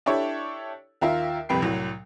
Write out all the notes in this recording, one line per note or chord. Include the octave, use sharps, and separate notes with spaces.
D4 E4 G4 A4 C#5
D#2 F4 A#4 E5
C2 F2 G3 B4 G5 C7
C2 A2 F#3